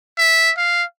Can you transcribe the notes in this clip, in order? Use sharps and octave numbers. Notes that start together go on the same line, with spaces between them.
E5
F5